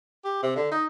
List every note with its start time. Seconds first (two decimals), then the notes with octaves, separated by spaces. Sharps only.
0.24 G4
0.43 C3
0.56 D3
0.71 D#4